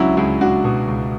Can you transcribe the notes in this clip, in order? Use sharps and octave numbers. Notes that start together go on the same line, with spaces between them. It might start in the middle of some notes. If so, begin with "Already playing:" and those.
Already playing: C#2 F#3 C#4 D4 E4 F#4
C#2 E4 G#4
C#2 D4 F#4
B2
C#2